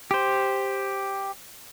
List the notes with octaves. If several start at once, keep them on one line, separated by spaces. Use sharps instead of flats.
G4 C5